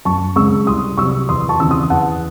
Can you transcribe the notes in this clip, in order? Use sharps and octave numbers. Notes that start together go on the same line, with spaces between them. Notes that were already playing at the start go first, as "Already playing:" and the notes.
F#2 A5 C#6
C#3 G#3 C4 C#6 E6
C2 C6 D#6
C3 F#3 C4 C#6 E6
E2 C6 D#6
A5 C#6
C#3 E3 C4 E6
C6 D#6
E2 F#5 A5